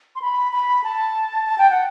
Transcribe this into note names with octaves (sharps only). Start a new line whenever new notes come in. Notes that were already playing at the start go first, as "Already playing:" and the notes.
C6
B5
B5
A5
A5
G5
F#5